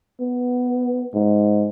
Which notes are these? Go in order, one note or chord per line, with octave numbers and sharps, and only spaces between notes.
B3
G#2